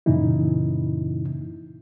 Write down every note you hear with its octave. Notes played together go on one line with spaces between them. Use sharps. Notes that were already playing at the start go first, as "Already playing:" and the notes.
F#2 A#2 C#3 E3 D#4 E4